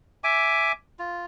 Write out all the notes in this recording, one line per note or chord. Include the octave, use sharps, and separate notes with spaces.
E5 G#5 D6
F4